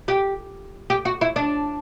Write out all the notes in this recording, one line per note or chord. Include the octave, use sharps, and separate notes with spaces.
G4
G4
F#4
E4
D4